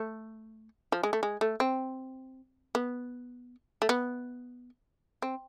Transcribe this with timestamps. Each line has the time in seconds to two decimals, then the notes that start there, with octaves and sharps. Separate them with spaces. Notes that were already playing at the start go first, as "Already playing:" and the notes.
Already playing: A3
0.92 F3
1.03 G#3
1.13 A3
1.23 G#3
1.41 A3
1.60 C4
2.75 B3
3.82 A3
3.89 B3
5.22 C4